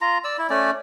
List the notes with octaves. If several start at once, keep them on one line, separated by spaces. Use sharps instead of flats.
F4 A#5
D5 E6
E4
A3 C#4 D5